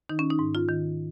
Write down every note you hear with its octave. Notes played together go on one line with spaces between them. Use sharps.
D#3 D#4
C#4
D#4
G#2
F4
D#3